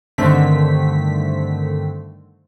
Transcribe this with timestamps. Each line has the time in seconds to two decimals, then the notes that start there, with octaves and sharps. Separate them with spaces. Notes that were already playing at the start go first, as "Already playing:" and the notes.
0.18 G2 D3 D#3 A3 C4 B6